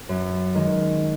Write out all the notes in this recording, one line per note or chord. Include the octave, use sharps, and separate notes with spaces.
F#2
D#3 G#3